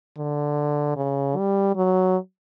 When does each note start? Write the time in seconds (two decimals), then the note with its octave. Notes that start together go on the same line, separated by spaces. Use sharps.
0.18 D3
0.97 C#3
1.37 G3
1.75 F#3